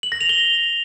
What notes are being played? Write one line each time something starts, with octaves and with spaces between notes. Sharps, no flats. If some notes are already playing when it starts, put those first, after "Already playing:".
F#7
A#6
F7
G7